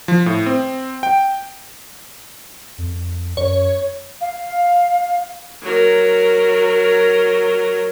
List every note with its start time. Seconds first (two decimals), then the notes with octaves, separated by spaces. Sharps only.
0.08 F3
0.26 A2
0.46 C4
1.03 G5
2.78 F2
3.37 F#2 C#5
4.21 F5
5.63 F#3 A#4